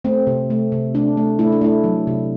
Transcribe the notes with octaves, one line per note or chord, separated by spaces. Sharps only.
A3 C4
C3
A3
C3
A3 D4
A3
A3 E4
D4
A3 E4
F#3
C3